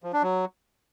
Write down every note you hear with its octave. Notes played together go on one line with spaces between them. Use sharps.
F3
D4
F#3